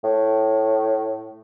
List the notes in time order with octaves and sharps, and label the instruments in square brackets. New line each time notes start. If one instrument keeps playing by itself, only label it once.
[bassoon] A2